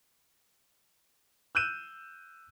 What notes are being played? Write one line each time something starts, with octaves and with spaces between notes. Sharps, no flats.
E6 F#6 G6 D#7 E7